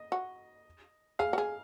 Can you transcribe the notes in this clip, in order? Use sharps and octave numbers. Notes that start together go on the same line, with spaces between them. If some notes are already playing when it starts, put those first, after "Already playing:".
Already playing: D#5
F#4
G#4 F5
F#4
G#4